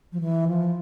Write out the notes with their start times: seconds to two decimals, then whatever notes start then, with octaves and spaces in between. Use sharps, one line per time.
0.13 F3
0.20 E3
0.48 F3